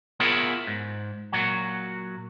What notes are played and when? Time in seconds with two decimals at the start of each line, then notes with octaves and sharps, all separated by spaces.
0.20 B3 E4 F4 G#4 A#4 C#5
0.67 G#2
1.33 A#2 F#3 F#4